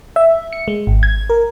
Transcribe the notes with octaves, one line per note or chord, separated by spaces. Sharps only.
E5
C#7
G#3
G#1
G#6
A#4